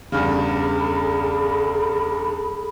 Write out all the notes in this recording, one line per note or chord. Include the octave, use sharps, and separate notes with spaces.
E2 G2 C#3 G#4 A4 B5